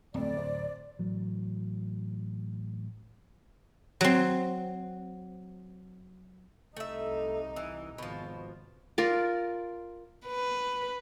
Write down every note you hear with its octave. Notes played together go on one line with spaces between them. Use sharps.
D1 F2 A2 D5
C5
A1 F#3
F#3 C4
C2 A3 D#4 E5
E3
G#1 B2 F3
F4 A#4 D5
B4